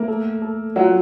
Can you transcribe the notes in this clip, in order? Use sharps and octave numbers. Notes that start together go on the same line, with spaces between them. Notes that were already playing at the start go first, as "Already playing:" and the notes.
Already playing: A3 A#3 A#4
A4
A4
F#3 F4 F#4